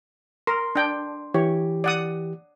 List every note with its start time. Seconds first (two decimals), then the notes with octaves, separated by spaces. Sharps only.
0.47 A#4 C6
0.75 D4 G5
1.34 E3 G4 C#5
1.84 D5 F#5 D#6